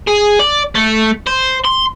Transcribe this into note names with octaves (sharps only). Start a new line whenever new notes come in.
G#4
D5
A3
C5
C6